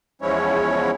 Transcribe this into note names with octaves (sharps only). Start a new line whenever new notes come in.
E2 F3 G#3 C#4 E4 C#5